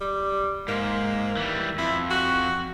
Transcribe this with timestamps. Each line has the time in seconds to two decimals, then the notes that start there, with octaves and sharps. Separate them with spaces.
0.01 G3
0.68 G#2 A#3
1.37 E3 G3
1.78 F2 E4
2.11 F#4